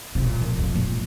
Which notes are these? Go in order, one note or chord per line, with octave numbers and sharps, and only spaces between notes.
C3
A#2
F2
F2
A#2